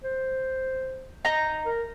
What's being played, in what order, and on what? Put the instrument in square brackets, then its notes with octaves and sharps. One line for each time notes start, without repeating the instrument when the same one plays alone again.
[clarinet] C5
[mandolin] D#4 A#5
[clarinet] A#4